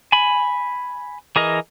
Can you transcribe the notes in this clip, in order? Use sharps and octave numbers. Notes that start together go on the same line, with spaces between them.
G#5 B5
E3 G#4 A#4 D#5